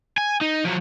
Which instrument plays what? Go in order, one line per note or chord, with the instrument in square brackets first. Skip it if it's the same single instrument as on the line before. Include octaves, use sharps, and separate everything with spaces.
[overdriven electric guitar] G#5
D#4
F3 F#3